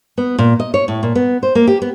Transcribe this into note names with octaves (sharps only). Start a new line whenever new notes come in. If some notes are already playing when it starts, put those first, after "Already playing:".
B3
A#2
D#5
C#5
A2
A#2
B3
C5
A#3
G4
B3